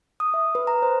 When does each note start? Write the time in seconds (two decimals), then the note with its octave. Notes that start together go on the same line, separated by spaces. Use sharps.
0.20 D#6
0.34 E5
0.55 B4
0.67 A#5
0.82 C5